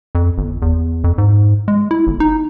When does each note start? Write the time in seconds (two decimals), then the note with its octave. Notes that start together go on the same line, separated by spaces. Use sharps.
0.15 F2
0.38 G1
0.62 E2
1.04 F2
1.18 G#2
1.68 G#3
1.91 E4
2.07 G1
2.20 D#4